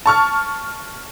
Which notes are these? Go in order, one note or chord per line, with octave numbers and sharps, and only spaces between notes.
A5 C#6 F6